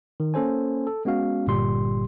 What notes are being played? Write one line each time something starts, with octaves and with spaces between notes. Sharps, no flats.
D#3
A#3 C#4 A4 C5 G#5
A4
G#3 B3 C#4 F#4 F5
G1 A#2 G3 G4 C6